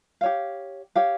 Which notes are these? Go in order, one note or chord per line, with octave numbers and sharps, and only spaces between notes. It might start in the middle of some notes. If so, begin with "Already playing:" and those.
G4 C#5 F5
G4 C#5 F5